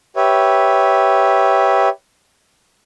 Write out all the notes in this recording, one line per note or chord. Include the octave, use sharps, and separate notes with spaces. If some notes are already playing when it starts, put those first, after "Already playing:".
G4 B4 C#5 E5